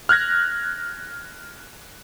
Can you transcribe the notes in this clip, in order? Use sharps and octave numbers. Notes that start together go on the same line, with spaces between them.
F6 F#6 G#6 A#6